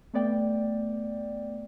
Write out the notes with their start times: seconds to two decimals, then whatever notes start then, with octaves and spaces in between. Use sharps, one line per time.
0.14 A3 B3 D5 G5